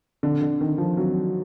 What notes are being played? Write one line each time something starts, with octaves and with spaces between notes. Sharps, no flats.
D3
D3
D#3
F3
F#3